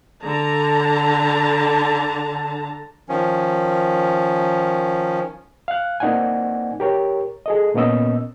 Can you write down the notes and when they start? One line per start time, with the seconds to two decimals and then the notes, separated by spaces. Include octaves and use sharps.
0.21 D3 A5 A#5
3.09 D#3 F3 C#4
5.68 F5 F#6
6.00 A#3 C4 D#4 D5 F#5 G#5
6.80 G4 A#4 C#5
7.46 G#4 A4 D#5
7.74 A#2 A#3 B3 C#4 D#5 E6